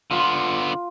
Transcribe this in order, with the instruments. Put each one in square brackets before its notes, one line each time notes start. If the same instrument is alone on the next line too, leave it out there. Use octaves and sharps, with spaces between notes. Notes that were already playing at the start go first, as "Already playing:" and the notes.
[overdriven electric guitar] D3 B3 [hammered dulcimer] F4